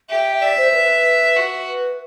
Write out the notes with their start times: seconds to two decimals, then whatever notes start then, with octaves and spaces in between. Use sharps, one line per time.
0.10 G4 E5
0.41 D5 E5
0.58 C5
0.73 B4
1.37 F#4
1.68 B4